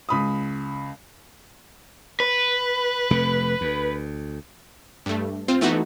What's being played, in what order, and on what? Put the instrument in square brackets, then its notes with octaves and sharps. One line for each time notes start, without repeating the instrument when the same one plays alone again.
[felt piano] C#2 B5 D#6
[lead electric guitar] B4
[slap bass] F1 C3 A3
D2
[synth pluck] G2 A3
C4 F4 C5
E3 A3 B3 D#4 F#4